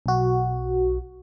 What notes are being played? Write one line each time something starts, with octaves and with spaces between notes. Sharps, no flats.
B1 F#4